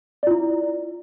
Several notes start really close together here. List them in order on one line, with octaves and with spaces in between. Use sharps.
D5 F4 E4